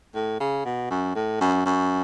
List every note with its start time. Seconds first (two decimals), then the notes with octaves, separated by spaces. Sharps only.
0.15 A2
0.40 C#3
0.65 B2
0.90 F#2
1.15 A2
1.41 F#2
1.66 F#2